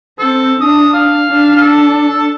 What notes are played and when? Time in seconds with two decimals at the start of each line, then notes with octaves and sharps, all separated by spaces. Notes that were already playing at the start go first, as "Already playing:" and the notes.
0.19 C4 A4
0.60 D4 D#6
0.93 F5
1.29 D4
1.61 A4